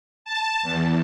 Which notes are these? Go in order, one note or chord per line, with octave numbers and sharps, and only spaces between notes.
A5
E2